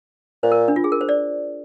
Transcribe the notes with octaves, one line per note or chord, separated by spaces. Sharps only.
A#2 C5
A#4
D4
F4
G#4
A#4
C5
D5